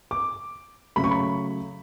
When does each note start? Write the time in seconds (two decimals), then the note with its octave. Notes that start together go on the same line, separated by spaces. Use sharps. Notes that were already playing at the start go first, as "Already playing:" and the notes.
0.11 D6
0.96 C#3 F#3 A3 B5
1.04 C#6
1.11 B5